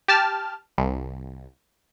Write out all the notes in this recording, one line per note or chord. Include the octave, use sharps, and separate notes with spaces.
G4 A5 F6
C2